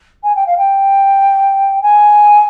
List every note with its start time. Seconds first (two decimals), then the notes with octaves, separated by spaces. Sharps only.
0.23 G#5
0.35 G5
0.46 F5
0.57 G5
1.82 G#5